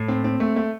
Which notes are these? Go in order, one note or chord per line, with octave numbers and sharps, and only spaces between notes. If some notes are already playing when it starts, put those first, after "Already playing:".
Already playing: A2
C4
C4
A3
A3